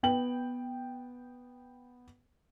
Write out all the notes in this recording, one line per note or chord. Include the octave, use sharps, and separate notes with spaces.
B3 G5 F#7